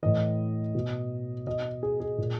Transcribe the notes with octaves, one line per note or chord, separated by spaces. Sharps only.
A2 E3 D#5
B2
B2 D#5
G#4
G#4
A#2